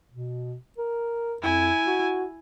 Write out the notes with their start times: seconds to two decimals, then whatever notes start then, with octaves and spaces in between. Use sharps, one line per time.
0.12 B2
0.78 A#4
1.42 F2 E4 G#5
1.87 F#4